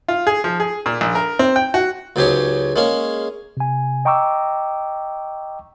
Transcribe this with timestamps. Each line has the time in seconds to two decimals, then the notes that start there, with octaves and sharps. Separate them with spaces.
0.08 F4
0.27 G#4
0.44 F3
0.60 G#4
0.86 A#2
1.01 A#1
1.15 A#4
1.39 C4
1.56 G5
1.74 F#4
2.16 C#2 G#2 F#3 G4 G#4 C#5
2.76 G#3 A#3 C#4 G#4
3.57 C3 G#5
4.05 D#5 G5 A#5 C#6 D6 E6